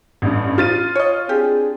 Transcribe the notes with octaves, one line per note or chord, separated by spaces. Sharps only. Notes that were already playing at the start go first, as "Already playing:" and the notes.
A1 G2
F3 F4 A6 D#7
C#5 D#5
C4 D4 G4 G#4